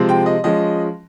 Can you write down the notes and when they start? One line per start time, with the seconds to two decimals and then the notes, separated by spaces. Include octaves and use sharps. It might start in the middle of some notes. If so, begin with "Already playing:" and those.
Already playing: C3 F3 G#3 C4
0.09 G5
0.26 D#5
0.44 F3 G#3 C#4 D#5